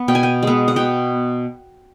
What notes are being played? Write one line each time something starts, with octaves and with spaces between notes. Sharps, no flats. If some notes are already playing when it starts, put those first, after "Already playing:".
Already playing: B3
B2 G5
G#5
G5
G#3 B3
F#5
B2 G5